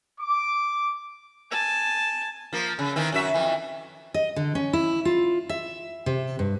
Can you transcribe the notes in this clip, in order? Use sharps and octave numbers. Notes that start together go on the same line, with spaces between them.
D6
G#5 A5
F3 A#3
C#3
D#3 E3 C4
F#2 F#4 E5
F2 E3
D#5
D3
C#4
E4
F4
E5
C3
G2